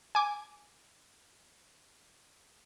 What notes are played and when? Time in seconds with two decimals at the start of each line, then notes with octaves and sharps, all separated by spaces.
0.15 G#5 D6